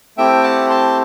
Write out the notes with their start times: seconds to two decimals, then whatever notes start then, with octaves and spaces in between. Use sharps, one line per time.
0.17 A3 C4 E4 G4 E5 G5
0.43 F#5 A5
0.70 A5 C6